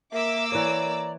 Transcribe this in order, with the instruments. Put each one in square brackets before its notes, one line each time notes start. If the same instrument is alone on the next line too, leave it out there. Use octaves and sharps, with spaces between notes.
[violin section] A#3 D6 E6 [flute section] E5
[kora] E3 C#5 [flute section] D5 A#5